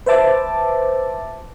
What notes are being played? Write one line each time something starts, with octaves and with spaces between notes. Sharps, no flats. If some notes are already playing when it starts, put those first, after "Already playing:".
B4 C5 E5 A5 D6